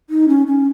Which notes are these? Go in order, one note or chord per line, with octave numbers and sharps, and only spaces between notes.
D#4
C#4
C#4